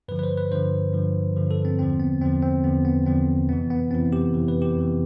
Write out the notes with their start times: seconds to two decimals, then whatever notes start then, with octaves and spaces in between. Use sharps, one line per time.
0.08 G2 D3 F3 B4
0.19 B4
0.23 C5
0.37 B4
0.52 G2 D3 F3 C5
0.93 G2 D3 F3
1.37 G2 D3 F3
1.51 A4
1.65 C4
1.79 E2 D3 F3 C4
2.00 B3
2.21 E2 D3 F3 C4
2.42 C4
2.64 E2 D3 F3 B3
2.85 B3
3.06 E2 D3 F3 C4
3.48 F2 C3 E3 B3
3.70 B3
3.91 F2 C3 E3 C4
4.13 G4
4.34 F2 C3 E3
4.48 B4
4.62 G4
4.76 F2 C3 E3